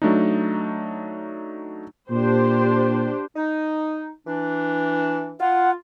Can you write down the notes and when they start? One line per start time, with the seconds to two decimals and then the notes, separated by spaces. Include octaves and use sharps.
0.02 F#3 A3 D4 D#4
2.11 A#2 D4 G4 C5
3.36 D#4
4.27 E3 D4
5.40 F4 F#5